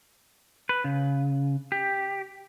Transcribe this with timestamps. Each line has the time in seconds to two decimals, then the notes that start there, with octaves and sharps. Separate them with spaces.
0.69 B4
0.84 C#3
1.72 G4